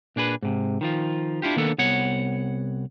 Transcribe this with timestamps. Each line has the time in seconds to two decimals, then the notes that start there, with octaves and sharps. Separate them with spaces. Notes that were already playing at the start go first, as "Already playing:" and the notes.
0.16 A#2 D4 G#4 B4
0.42 G#2 C3
0.81 D#3 F3 F4
1.42 D4 E4 F4 G4
1.56 D#3 A#3 B3 D4 A4
1.78 C2 B3 C#5 F#5